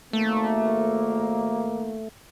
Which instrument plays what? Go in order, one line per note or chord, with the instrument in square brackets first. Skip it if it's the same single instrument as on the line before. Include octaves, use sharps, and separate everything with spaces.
[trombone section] G#1 A#3 [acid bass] A3